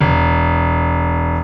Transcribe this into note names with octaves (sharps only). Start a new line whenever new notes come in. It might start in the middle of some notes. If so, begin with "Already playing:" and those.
E1